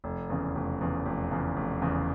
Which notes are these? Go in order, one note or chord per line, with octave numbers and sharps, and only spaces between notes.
F1
E2 C#3
F1
E2 C#3
F1
E2 C#3
F1
E2 C#3